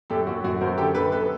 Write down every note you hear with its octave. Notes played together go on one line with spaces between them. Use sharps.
F#2 G4 A4
F#2 F#4
F#2 F#4
F#2 A#4 C5
D3 G4 A4
F#2 A4 B4
B3 A4 B4